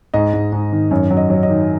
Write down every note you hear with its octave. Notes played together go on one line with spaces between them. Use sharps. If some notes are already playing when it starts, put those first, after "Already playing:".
G#2 D#5
G#2
G#2
D#3
F#2 C#5
F#3
D#5
F#3
D#5
D#3